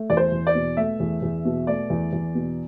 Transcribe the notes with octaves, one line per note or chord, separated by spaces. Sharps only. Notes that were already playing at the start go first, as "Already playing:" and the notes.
Already playing: A3
E2 D5
C5
E2
D5
B2
A3 E5
E2
E2
B2
A3 D5
E2
E2
B2